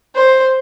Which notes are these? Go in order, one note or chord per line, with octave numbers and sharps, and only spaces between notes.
C5